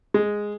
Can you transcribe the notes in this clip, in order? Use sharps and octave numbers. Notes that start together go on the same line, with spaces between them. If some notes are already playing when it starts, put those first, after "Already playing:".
G#3